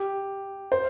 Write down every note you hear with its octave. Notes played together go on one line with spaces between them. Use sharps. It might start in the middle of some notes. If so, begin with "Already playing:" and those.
Already playing: G4
C5